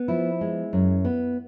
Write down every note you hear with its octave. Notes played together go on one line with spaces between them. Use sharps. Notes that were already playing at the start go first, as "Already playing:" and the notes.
Already playing: B3
F3 E4
G#3
F#2
B3